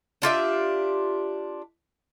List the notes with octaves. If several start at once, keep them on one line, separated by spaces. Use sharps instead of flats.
D4 F4 G4 E5